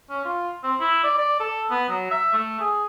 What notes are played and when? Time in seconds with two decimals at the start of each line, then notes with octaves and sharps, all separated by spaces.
0.10 C#4
0.25 F4
0.63 C4
0.80 E4
1.04 D5
1.18 D5
1.40 A4
1.70 B3
1.89 F#3
2.11 E5
2.33 A3
2.60 G#4